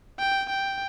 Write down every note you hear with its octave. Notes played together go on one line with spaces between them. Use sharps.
G5
G5